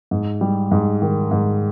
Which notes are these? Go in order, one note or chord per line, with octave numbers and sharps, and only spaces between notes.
G#2
G3
G#2
D#3
G#2